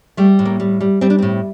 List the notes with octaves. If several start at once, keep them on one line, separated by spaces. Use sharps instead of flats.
G3 A3
A2
A#3
G3
G3
G3 C4
D4
A2 C4